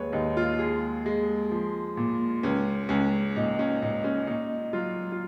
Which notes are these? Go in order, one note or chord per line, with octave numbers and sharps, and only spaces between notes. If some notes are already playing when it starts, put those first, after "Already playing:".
Already playing: D#2 G#3 B4 C#5
D#2 D#4
F4
G#3 G#4
G#3
F3
A#2
C#2 C#4
C#2 C#4
A#2 D#4
C#4
A#2 D#4
C#4
A#2 D#4
F#3 F4
F4